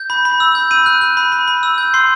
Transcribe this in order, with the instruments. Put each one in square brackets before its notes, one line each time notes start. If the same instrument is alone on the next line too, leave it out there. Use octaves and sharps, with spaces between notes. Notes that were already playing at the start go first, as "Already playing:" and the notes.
Already playing: [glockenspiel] G6
B5
B5
E6
G6
B5 D#7
F#6
F#6
B5
B5
B5
E6
G6
C6 C7